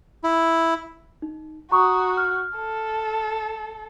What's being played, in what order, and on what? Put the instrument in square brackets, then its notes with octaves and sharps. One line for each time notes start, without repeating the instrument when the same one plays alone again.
[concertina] E4
[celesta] D#4
[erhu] F#4 [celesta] A#5 C#6 D#6
[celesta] F6
[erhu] A4